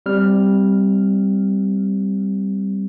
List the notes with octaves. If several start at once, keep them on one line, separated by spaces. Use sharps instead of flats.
G3 C4 F6